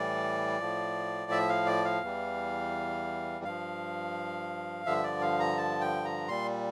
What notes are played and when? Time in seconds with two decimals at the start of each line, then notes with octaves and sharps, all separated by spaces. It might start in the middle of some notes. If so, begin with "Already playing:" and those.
Already playing: A2 E3 G3 D5
0.60 A2 F3
1.31 E5
1.49 F5
1.67 D5
1.85 F5
2.02 E2 E3 G3
3.44 G2 F3 F5
4.86 G2 D3 F3 E5
5.04 D5
5.22 F5
5.40 A#5
5.57 A5
5.81 G5
6.05 A#5
6.28 A#2 G3 C6